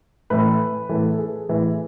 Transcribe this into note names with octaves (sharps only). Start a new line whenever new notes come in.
A2 E3 B4
A2 E3 A4
A4
G#4
A2 E3